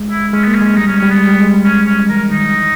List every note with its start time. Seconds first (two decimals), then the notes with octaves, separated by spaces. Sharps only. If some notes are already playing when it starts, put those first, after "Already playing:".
Already playing: G#3
0.11 E4
0.33 G#3 C#4
0.44 B3
0.47 A#3
0.55 C#4
0.62 G#3
0.66 C#4
0.76 G3 D#4
0.88 G#3 C#4
0.99 C#4
1.03 G3
1.10 G#3 B3
1.28 G3
1.41 G#3
1.53 G3
1.65 G#3 C#4
1.79 G3
1.87 C#4
2.09 E3 A#4
2.31 D#3 D#4
2.53 E3